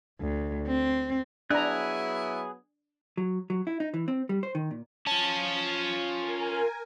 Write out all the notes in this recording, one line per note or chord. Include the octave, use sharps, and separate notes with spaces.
D2
C4
F#3 B3 D4 E4 G#4 A#5 F#6
F#3
F#3
E4
D#4
E3
C4
G3
C5
D#3
A#2
C#4 F4 A5
A#4 G#5